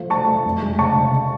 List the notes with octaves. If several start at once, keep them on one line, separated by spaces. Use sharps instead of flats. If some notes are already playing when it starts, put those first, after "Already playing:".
Already playing: F3 A3
A3 A5 C#6
A3
F1
G#3
C#3 A5 C#6
C#3